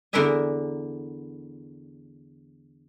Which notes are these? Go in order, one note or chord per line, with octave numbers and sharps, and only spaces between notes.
E2 D3 E4 A#4 E5 G#5